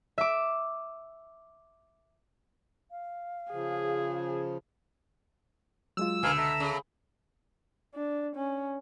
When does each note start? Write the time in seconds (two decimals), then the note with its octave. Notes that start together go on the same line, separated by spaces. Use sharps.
0.18 E5 D6
2.91 F5
3.52 C#3 F3 G#4
5.97 F#3 G#3 F4 E6
6.23 C#2 B2 D3 A#4 F5 G#5
6.37 A4 E5 A#5
6.60 C#3
7.95 D4
8.36 C#4